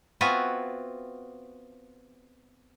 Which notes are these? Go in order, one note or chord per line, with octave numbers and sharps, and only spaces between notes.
B3 C4 F4 F#4 E5 G#5